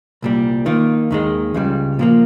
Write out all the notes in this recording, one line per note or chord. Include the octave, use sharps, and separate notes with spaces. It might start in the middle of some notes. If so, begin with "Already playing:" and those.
C2 A#2 G3
D#3 A#3 F4
D#2 D#3 G#3
C#2 C#3 G3
A#2 F3 A#3